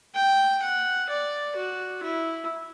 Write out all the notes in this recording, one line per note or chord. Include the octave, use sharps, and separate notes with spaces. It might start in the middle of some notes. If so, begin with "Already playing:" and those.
G5
F#5
D5
F#4
E4